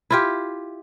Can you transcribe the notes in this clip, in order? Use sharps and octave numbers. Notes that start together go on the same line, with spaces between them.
E4 F4 G4